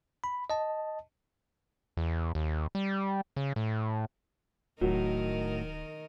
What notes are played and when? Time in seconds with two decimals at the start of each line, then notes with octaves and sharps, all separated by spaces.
0.24 B5
0.50 D#5 A5
1.97 E2
2.35 D#2
2.75 G3
3.36 C#3
3.56 A2
4.81 D1 A2 D#3 F#3 A#4 D#5